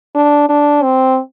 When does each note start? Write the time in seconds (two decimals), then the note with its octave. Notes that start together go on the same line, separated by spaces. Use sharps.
0.15 D4
0.49 D4
0.83 C4